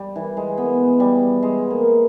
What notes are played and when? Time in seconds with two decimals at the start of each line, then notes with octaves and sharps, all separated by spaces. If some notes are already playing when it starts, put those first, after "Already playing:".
Already playing: G3
0.16 E3
0.37 G#3
0.58 B3
1.00 G3
1.43 G#3
1.71 A#3